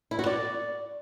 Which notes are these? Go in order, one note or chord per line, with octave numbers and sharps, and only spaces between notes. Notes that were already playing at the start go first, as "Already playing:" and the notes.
E4
F#4
D5